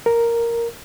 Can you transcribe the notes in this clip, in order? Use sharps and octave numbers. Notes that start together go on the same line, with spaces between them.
A#4